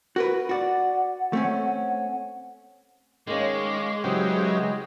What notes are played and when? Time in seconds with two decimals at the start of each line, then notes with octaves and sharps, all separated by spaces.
0.16 F#4 A#4 B4
0.49 F#4 D5 F#5
1.33 A3 C4 C#4
3.27 D#3 G#3 C#4 F5 C#6 D6
4.04 C#3 E3 F#3 C4 G4 D#6